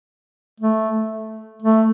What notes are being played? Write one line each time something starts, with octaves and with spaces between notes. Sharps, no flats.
A3
A3